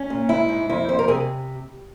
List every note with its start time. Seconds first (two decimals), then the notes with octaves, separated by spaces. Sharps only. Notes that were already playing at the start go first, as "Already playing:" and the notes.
Already playing: C#4
0.10 A#2
0.29 G#2 E4
0.49 G#2
0.70 F2 E4
0.89 F2 C5
0.99 A#4
1.08 C3 G#4